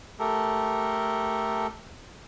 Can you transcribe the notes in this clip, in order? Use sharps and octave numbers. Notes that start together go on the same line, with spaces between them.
A3 G4 A4 A#4